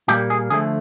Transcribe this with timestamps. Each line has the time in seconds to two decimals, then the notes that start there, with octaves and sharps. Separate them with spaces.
0.08 A#2 G3 A#3 G4
0.30 G#4
0.50 D3 F3 A3 G#4